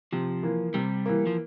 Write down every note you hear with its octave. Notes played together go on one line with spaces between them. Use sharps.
C3 F3
E3 A#3
C3 G3
E3 A#3
F3